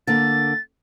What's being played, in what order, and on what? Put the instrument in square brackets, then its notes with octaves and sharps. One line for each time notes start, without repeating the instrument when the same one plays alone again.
[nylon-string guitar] D3 A#3 [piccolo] A6